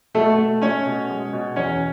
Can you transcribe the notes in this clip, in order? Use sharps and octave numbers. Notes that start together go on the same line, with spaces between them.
B2 A3 A4
A3
A3 C#4 C#5
B2
G#3
B2
E2 C#4 C#5